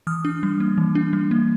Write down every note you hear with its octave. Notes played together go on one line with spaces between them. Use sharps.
E3 D#6 F6
D4
G3
A#3
E3
D4
G3
A#3